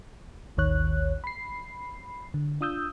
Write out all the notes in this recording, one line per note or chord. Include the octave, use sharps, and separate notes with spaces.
A1 D#2 D#3 C#5 F#6
B5 C7
D3
D4 F4 D#6 E6 G6